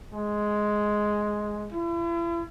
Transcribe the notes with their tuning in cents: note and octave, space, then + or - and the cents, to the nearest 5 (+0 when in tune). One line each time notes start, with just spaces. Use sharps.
G#3 +5
E4 +40